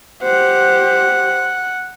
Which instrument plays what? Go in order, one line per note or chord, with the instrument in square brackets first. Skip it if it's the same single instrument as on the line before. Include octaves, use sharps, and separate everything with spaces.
[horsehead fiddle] G4 C5 [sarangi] F#5